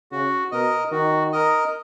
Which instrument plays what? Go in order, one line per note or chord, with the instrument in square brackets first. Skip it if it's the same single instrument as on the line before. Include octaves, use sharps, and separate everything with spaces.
[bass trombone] C#3 [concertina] F#4
[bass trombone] B2 [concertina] A#4 D#5
[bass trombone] D#3 [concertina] F#4
[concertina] A#4 D#5